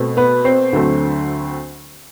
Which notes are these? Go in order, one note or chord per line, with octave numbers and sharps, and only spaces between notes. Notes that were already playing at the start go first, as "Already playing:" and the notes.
Already playing: B2 A3 C4
B3 B4
C4 C5
D2 D3 F#3 A3 C4